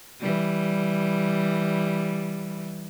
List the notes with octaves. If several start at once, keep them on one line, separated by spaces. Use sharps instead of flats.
E3 G3